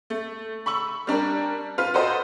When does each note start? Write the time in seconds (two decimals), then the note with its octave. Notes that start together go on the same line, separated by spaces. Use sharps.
0.10 A3
0.66 B5 C#6 E6 F#7
1.07 G3 D4 A#4
1.78 F4 B4
1.94 F#4 A4 B4 C5 D#5